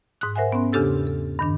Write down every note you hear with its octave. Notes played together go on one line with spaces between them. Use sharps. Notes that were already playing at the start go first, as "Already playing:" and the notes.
G#2 D#6 F#6
A#4 C5 E5 F#5 G#5
B3 C#4 C6
E2 C#3 D4 G4 A4 E6
A4
G2 D#3 D4